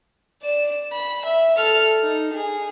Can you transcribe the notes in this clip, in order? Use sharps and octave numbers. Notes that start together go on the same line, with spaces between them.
D5 E7
B5
E5
A4 F6
D#4
G#4